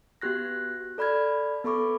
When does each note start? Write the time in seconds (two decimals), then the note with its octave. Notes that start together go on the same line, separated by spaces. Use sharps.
0.21 B3 F#4 G4 F#6 A#6
0.98 A4 D5 B5 F6 G#6
1.64 B3 A4 B5 C#6 D6